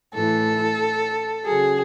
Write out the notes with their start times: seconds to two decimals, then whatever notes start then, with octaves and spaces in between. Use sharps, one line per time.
0.14 A2 E3 A4
1.45 C#3 F#3 G#4